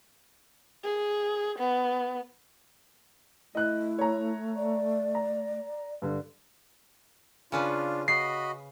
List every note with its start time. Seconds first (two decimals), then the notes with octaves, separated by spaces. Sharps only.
0.84 G#4
1.59 B3
3.55 A3 E4 D#5 F#6
3.99 C#5 A#5
4.56 D5
5.15 A#5
6.02 G2 D3
7.52 C#3 C#4 D4 F4 B4
8.08 F#4 D#5 B5 C7